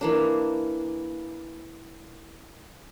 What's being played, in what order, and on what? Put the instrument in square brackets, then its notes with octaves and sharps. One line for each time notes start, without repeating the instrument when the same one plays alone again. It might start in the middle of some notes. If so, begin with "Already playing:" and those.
[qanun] E3 A#3 D4